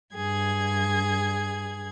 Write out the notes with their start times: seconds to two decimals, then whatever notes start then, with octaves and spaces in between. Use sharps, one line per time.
0.15 G2 G#4 G#6